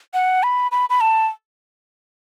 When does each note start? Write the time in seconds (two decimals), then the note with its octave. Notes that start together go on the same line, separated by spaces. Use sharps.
0.14 F#5
0.43 B5
0.72 B5
0.90 B5
1.01 A5